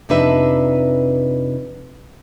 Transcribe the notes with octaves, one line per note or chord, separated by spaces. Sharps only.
F2 C3 D4 D#4 B4 E5